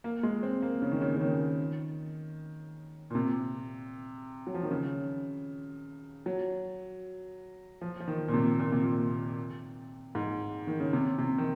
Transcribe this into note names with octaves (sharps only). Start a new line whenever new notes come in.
A#3
G#3
C4
A#3
C#3
D#3
C#3
C#3
D#3
A#2
C3
F#3
F3
D#3
C#3
F#3
F3
F3
D#3
A#2
C3
A#2
C3
A#2
G#2
D#3
C#3
C3
C3
D#3